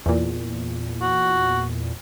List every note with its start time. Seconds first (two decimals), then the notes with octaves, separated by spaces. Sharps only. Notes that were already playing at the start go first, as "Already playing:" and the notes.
0.06 E2 A#2
1.02 F#4